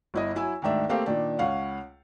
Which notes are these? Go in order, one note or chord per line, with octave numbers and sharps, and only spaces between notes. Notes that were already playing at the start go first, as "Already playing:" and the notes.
G1 E4 D#5
F#3 E4 G#5 E6
D2 G#2 D#3 D4 E5
A3 A#3 C4 G4 F5
A#2 D#3 D4
C#2 C#4 F5 F#5